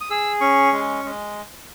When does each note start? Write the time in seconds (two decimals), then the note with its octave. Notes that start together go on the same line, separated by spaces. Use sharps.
0.01 D#6
0.10 G#4 E6
0.41 C#4 C#6
0.73 G#3
1.05 G#3